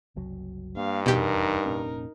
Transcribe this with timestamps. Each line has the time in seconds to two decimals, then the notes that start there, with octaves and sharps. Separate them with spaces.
0.16 F#1 C2 F#3
0.77 G2 A#3 F5
1.06 F1 E2 B2 D#4 G4 A#4
1.66 F1 A#2 C#4